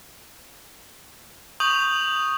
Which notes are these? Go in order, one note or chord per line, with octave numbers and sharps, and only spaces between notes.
C#6 D#6 G6 F7 F#7